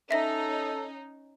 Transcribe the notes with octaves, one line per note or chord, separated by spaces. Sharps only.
C#4 D#4 A4 E5 A#6